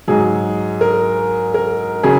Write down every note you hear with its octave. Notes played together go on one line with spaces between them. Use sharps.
G#2 F#3 G#4
A#4
A#4
C#3 F#3 G#4